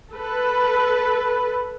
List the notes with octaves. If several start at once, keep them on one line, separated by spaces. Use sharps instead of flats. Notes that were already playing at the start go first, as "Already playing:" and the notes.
A4 B4